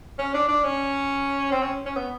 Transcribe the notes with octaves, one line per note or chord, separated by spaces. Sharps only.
C#4
D4
D4
C#4
C4
C#4
C#4
B3